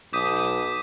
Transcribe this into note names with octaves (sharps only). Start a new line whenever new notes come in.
B1 D6 D#6 G6 B6